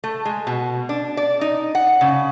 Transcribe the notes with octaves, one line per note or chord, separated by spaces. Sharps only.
A3
G#3
B2
D4
D5
D#4
F#5
C#3